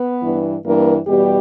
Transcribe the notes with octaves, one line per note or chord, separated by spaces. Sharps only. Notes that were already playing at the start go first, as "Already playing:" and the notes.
Already playing: B3 B4
G2 E3
G2 E3 A#3 A#4
E2 B2 G3 G4